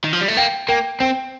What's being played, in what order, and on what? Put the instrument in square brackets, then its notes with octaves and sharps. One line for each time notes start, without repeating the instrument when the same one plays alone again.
[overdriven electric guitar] D#3
F3
G3
A3
[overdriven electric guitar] A#3 [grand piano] G5
[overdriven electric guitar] A#3 [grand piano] G5
[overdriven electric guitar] C4 [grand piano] G5